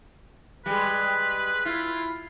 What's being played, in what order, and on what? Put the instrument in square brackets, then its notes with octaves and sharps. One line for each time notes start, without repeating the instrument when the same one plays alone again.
[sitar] G3 G#3 [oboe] B4
[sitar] E4 [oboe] F4